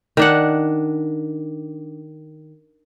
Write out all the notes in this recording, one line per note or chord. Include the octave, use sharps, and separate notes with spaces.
D#3 D4 F#5